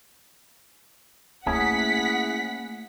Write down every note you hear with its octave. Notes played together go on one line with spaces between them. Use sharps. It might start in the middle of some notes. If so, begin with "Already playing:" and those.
A3 A#3 C#4 E4 G#4 F#5 B6